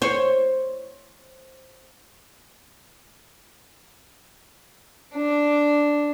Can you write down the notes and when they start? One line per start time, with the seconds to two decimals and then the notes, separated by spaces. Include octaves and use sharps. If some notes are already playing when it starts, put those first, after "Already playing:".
0.02 C5 C#5
5.14 D4